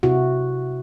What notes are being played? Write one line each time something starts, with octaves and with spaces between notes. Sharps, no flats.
C3 E4 F#4